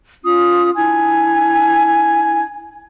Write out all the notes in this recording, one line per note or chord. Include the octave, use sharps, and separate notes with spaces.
C#4 F4 D#6
D4 E4 G#5 G#6